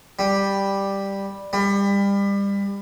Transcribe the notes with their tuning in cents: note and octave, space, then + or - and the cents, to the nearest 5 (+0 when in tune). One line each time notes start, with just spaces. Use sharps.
G3 +5
G3 +30